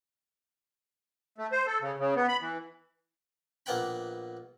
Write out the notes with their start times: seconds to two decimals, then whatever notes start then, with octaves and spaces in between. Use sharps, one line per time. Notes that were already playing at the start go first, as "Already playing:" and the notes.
1.38 A3
1.52 C5
1.67 A4
1.81 C#3
1.99 C#3
2.16 B3
2.28 B5
2.41 E3
3.66 A#1 A#3 B3 F#5 G5 B5